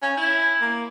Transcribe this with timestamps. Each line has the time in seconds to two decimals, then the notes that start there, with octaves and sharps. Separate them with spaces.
0.02 C#4
0.17 E4
0.61 A#3